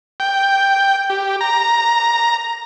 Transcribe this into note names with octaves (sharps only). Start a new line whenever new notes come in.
G5
G4
A#5